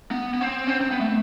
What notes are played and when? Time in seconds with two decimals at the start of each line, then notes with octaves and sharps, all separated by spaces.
0.11 B3
0.34 B3
0.41 C4
0.67 C#4
0.70 C4
0.81 C4
0.91 B3
1.01 A3